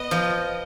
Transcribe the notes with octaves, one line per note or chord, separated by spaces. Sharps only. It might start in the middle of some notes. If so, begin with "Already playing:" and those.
Already playing: B3 D#5
F3